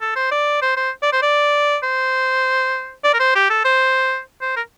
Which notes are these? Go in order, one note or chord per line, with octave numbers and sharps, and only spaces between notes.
A4
C5
D5
C5
C5
D5
C5
D5
C5
D5
A#4
C5
G4
A4
C5
C5
A#4